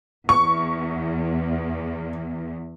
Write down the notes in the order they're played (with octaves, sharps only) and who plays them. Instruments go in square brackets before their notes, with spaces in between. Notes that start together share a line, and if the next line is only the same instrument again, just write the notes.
[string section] E2 [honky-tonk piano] C#6